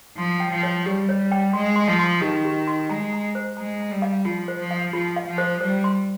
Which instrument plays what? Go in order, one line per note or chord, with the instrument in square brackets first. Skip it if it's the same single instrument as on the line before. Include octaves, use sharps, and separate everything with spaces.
[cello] F3 [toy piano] C6
[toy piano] G5
[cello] F3
[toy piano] C#5
[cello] G3 [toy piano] G4
[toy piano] C#5
G5
[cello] G#3 [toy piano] C6
[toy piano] C6
[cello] F3
[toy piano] C6
[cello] D#3 [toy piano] G4
[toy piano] G4
C6
[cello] G#3 [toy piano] A#5
[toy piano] A#5
C5
[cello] G#3 [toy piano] A#5
[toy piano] A#5
[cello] G3
[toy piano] F5
[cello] F3 [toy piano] F4
[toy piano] C5
[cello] F3
[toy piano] F5
[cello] F3 [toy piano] F4
[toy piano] F5
[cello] F3
[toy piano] C5
[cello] G3 [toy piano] C5
[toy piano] C6